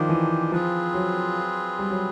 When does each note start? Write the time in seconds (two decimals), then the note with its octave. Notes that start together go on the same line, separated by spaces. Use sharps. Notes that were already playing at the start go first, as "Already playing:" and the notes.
Already playing: D#3 F3 A#3 D4 G4 C5
0.09 E3
0.52 F3 C4 F4 G#4 B4
0.94 F#3
1.79 G3
1.91 F#3